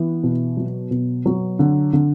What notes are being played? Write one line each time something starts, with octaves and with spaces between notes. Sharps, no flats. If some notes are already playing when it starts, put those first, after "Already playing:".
Already playing: E3 B3
B2
F#3
B2
F#3
D3
D3